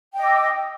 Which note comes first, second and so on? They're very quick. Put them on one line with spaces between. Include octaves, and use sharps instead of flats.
G5 D#5 D6 E6